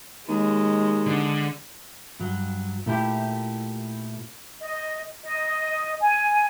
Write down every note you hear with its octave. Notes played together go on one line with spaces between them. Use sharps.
D#2 G#3
D3
G2 F#3
A#2 A3 E4 G4
D#5
D#5
G#5